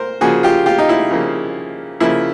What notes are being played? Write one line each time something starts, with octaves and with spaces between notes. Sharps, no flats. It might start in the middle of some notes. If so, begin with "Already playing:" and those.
Already playing: A#4 C5
C#3 F3 A#3 F#4 G#4
F4 G4
F4 G4
D#4
E4
C#3 F3 A#3
C#3 F3 A#3 E4